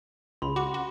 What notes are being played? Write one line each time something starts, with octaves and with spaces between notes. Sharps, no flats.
C#2 B5 C6
F#4 D6
F#4